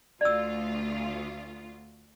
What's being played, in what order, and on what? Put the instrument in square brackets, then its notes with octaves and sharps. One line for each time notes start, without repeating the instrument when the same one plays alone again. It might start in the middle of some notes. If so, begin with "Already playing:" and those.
[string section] D2 F4 [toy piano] D5 E6